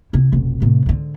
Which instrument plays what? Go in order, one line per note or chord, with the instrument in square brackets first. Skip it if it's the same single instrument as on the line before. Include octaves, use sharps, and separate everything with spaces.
[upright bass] C3 E4
F1 B1
A2 C3
G#2 D3